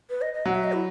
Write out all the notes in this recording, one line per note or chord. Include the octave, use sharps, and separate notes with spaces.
B4
D#5
D#5
F#3 F#5
E5
D#5
E4